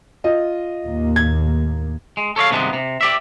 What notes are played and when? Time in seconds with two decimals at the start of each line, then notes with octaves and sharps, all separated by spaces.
0.24 F4 D#5
0.85 D#2 A2 A#3
1.16 G#6
2.17 G#3
2.36 A4 C#5 D#5 F5
2.50 G2 C3 D#3 G#3 B3
2.73 C3
3.01 G4 D5 E5